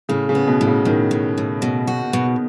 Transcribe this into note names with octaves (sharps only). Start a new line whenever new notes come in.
A2 C#3
C#3
B3
B2
A2
C#3
A2 D#3
A2
A2
B2
F#4
B2